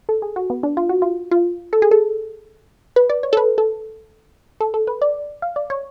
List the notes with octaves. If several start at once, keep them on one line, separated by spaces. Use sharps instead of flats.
A4
G#4
F#4
B3
D4
F4
F#4
F4
F4
A4
G#4
A4
B4
D5
C#5
A4
B4
A4
A4
A4
B4
D5
F5
D5
C#5